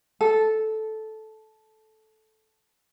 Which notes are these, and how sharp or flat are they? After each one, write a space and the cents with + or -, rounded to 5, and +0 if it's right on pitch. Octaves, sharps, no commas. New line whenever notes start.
A4 -10